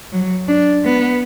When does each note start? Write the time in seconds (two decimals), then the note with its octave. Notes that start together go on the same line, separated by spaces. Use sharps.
0.12 F#3
0.48 D4
0.84 B3